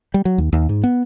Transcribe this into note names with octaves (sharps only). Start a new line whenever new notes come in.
G3
F#3
D#2
D#2
G#2
B3